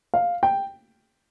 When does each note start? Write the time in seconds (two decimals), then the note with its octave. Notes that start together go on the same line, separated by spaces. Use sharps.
0.14 F5
0.43 G5